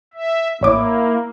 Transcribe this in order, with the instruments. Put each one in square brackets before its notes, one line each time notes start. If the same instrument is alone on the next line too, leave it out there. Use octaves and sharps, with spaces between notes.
[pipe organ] E5
[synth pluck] A1 C#5 D6 [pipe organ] A#3 [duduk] E4